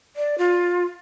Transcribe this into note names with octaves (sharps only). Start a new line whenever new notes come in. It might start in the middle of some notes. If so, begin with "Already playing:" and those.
D5
F4